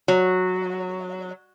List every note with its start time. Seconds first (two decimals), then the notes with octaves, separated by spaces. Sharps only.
0.08 F#3